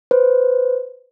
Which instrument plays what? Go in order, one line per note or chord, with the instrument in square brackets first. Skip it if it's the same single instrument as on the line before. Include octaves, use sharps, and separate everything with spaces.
[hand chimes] B4 C5